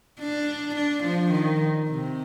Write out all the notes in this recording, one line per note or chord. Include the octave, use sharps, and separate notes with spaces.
D4
D4
F3
D#3
C3